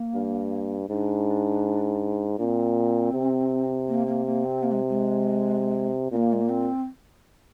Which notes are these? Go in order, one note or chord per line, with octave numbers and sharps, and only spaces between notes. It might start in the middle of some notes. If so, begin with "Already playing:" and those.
Already playing: A#3
G2
G#2 D4
A#2 C4 D4
C3
A#3
A#3
A#3
C4
A#3
G#3
G#3
A#2 A#3 C4
G#3
A#3
C4